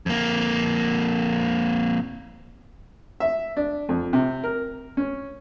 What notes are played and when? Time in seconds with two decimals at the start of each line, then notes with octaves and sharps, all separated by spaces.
0.06 F2 A#3
3.20 E5
3.57 D4
3.89 F2
4.13 C3
4.44 A#4
4.97 C#4